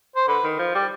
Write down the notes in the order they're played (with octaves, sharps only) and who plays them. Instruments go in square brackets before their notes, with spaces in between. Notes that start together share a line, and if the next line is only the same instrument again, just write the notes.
[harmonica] C5
[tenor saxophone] D3 [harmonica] B4
[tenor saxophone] D#3
F3
G3